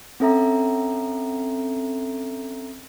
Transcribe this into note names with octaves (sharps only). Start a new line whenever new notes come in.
C4 C#4 A4 E5 A#5